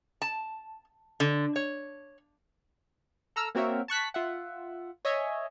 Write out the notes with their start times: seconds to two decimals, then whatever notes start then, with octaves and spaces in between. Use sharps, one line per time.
0.22 A5
1.20 D3
1.56 C#5
3.36 A4 A#5 E6 F6
3.55 A#3 C4 F#4 A#4 C#5 E5
3.88 A5 C#6 F#6 B6
4.14 F4 E5 F#5
5.05 C#5 D#5 E5 G#5